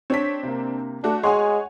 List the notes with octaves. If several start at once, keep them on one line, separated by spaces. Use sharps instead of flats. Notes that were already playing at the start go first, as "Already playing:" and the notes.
C4 D4 C#5 B6
C3 A#3
A3 D4 F#4
G#3 G#4 C#5 F#5 G#5 C6